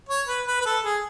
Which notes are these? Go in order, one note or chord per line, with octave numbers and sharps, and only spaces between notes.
C#5
B4
B4
B4
A4
G#4